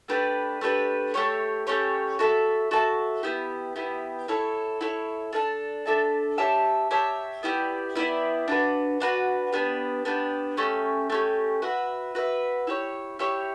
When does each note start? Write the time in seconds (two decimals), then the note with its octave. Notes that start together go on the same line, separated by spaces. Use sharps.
0.08 A3 D4 G4 B4
0.61 A3 D4 G4 B4
1.14 A3 C#4 G4 C#5
1.67 A3 C#4 G4 C#5
2.19 F#4 A4 E5 A5
2.71 F#4 A4 E5 A5
3.23 B3 E4 G4
3.76 B3 E4 G4
4.28 E4 A4 C#5
4.81 E4 A4 C#5
5.33 D4 A4 E5 A5
5.86 D4 A4 E5 A5
6.38 G4 C#5 E5 A5
6.91 G4 C#5 E5 A5
7.43 B3 E4 G4 D5
7.96 B3 E4 G4 D5
8.48 D4 F#4 B4
9.00 D4 F#4 B4
9.53 B3 D4 G4
10.05 B3 D4 G4
10.57 A3 C#4 G4
11.10 A3 C#4 G4
11.62 F#4 B4 E5
12.15 F#4 B4 E5
12.67 E4 G4 C#5
13.19 E4 G4 C#5